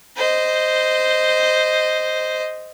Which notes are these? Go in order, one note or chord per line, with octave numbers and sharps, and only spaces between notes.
C5 D#5